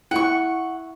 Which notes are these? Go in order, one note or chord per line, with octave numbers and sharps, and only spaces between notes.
E4 F#5 C#6